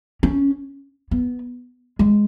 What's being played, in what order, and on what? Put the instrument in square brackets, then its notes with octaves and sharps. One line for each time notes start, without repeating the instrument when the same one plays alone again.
[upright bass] C#4
B3
G#3